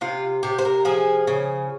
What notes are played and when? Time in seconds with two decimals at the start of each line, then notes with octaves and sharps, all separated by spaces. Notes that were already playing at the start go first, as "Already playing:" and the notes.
0.01 C3 F4
0.43 C3 G4
0.59 C5
0.65 A#4
0.85 F3 G#4
1.27 C#3